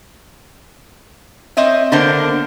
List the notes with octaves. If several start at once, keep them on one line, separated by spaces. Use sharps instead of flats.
C4 C#5 D#5 E5
D3 A#3 B3 D4 A#4 C5